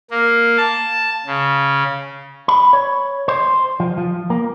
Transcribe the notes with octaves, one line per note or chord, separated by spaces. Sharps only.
A#3
A5
C#3
B5
C#5
C5
F3
F3
A#3